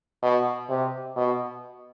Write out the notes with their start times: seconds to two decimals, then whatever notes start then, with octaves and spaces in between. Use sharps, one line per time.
0.23 B2
0.70 C3
1.17 B2